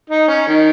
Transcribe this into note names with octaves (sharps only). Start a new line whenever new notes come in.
D#4
C#4
D#3